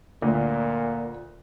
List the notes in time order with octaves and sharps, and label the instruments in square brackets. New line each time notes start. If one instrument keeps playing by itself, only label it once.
[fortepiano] D2 [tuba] A#2